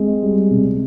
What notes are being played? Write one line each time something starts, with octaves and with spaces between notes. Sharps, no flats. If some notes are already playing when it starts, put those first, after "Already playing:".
Already playing: G#3 C4
G3
C3